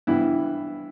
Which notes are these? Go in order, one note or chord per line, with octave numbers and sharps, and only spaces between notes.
G2 E3 B3 E4